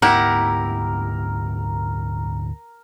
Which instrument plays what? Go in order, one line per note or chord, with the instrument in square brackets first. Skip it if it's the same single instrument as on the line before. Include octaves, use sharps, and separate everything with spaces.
[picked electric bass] D2 G#2 B3 [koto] E4 G4 F#5 [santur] A#4